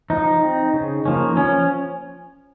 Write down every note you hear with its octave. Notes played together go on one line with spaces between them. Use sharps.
F3 D#4
C4
C#3
F3 A#3 C#4
F3 C#4